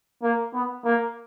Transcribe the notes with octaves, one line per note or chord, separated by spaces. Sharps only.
A#3
B3
A#3